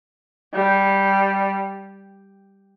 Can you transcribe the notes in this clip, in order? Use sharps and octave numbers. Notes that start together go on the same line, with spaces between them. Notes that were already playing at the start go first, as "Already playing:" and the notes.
G3